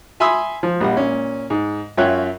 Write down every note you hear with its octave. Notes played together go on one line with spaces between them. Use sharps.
E5 G#5 B5 C6 D#6 E6
F3
A#1 G3 F#5
A#2 C#4
G#2
F#2 F4 C#5 E5 G5 F#6